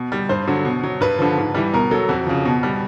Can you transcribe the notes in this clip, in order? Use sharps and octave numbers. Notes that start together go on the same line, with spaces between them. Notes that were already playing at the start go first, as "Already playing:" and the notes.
Already playing: B2
G3
G2 C5
D3 F#3
B2
F#3
G2 B4
D3 F3
G#2
E3 G3
B2 A#4
F#3 A4
F2 F#4
C#3 F3
B2
G3